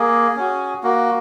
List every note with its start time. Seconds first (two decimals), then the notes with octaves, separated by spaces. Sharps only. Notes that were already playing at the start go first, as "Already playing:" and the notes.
Already playing: A#3 G#4
0.37 C#4 F#4
0.83 A#3 F#4